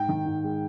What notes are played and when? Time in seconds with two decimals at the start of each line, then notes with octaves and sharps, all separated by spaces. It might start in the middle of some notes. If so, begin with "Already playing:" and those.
Already playing: G#2 G5
0.08 D#3
0.25 G#2
0.43 G#3